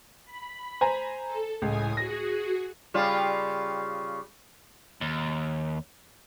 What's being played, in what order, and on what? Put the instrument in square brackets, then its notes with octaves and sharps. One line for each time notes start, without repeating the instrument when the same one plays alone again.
[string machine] B5
[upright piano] C5 G#5 A#5
[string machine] A4
[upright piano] C#2 [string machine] A2 G#5 D#6
[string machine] F#4 G#4 [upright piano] A#6
[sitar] C#3 G3 F4
[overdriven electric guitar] D#2